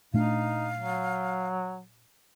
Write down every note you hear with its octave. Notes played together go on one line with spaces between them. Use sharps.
A#2 A3 D4 D#4 F5
F#3